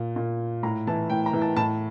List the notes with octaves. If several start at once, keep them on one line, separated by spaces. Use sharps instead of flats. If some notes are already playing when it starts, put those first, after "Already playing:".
Already playing: A#2
A#2
A2 A#5
E3 A5
A2 G5
A#5
E3
A5
A2 A5